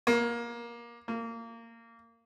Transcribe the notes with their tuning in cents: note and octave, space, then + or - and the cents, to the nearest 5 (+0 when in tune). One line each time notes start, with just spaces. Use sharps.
A#3 +20
A#3 -20